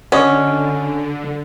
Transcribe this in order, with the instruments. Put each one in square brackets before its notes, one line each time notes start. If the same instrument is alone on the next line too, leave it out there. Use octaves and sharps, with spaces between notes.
[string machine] D3 [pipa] C#4 [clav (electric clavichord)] F#4 D5 D#5